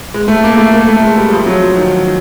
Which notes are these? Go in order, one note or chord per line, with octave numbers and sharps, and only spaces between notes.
G#3
A3
A#3
A3
A#3
A3
G#3
G3
F3
F#3
F3
D#3